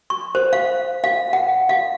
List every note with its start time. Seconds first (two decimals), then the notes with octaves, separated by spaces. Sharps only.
0.10 C#6
0.35 C5
0.53 F5
1.04 F5
1.33 F#5
1.69 F5